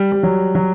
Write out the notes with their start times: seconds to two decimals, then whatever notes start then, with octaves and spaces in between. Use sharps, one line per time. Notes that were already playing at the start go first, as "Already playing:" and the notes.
Already playing: G3
0.12 G3
0.23 F#3
0.55 F#3